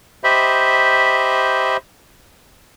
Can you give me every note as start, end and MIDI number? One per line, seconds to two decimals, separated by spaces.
0.24 1.77 67
0.24 1.77 72
0.24 1.77 75
0.24 1.77 76
0.24 1.77 83